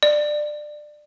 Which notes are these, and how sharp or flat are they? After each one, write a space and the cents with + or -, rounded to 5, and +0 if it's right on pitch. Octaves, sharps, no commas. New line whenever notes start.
D5 +20